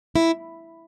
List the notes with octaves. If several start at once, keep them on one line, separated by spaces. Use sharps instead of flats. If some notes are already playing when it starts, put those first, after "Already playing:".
E4